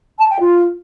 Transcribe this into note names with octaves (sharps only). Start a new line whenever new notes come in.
A5
G5
F4